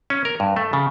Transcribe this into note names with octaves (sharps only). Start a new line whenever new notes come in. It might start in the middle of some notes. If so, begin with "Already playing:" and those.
C#4
A#4
G2
A3
C#3